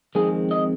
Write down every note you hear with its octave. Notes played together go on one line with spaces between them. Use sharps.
F2 D#3 G#3 C4 G#4
D#5